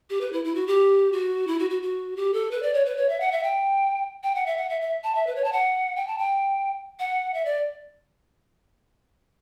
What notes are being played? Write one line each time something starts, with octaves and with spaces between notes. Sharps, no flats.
G4
B4
E4
E4
F#4
G4
F#4
E4
F#4
F#4
F#4
G4
A4
B4
D5
C#5
B4
C#5
E5
F#5
E5
G5
G5
F#5
E5
F#5
E5
E5
A5
E5
B4
C#5
A5
F#5
G5
A5
G5
F#5
E5
D5